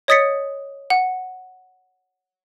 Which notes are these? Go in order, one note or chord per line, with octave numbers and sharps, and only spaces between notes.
C#5 D#5 D#6 A6 B6 C#7
F#5